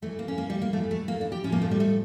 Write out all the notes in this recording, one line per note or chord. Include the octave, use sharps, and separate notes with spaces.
E2 E3 A3
A#3
C#4
A#3
G3
A#3
E2 E3 A3
A3
A#3
D4
G4
A2 F3 C#4
A#3
A3
G3
A3